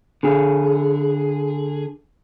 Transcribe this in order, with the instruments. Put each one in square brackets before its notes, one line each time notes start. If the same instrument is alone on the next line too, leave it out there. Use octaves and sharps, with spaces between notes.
[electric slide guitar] D3 G#4